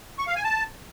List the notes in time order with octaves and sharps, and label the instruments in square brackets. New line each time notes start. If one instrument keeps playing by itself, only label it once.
[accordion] C#6
F5
G#5
A5